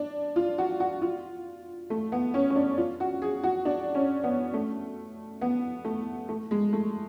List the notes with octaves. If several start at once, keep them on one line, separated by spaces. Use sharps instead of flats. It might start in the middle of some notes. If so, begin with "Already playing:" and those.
Already playing: D4
F4
F#4
F#4
F4
A3
B3
C#4
C#4
D4
F4
F#4
G#4
F#4
D4
C#4
B3
A3
B3
A3
A3
G#3
A3